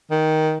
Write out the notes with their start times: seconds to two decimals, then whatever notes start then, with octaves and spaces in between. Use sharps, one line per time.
0.11 D#3